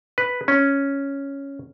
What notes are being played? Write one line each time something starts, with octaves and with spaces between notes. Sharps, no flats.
B4
C#4